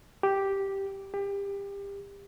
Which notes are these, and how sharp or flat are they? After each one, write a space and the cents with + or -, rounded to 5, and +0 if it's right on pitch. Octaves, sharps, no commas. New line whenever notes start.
G4 -5
G4 +25